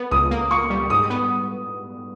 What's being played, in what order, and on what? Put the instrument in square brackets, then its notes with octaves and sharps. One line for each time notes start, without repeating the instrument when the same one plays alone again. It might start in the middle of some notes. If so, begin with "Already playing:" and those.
Already playing: [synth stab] B3
[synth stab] C#2 [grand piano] D#6
[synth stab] A#3
[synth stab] A#3 [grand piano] C#6
[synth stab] G3
[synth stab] G#2 [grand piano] D#6
[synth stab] B3